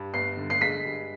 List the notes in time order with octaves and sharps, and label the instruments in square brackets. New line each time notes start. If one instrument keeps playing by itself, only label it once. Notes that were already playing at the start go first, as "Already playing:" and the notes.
Already playing: [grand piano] G2
[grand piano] G1 [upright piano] C7
[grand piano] D3
[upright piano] C7
[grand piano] G#3 [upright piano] B6
[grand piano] G2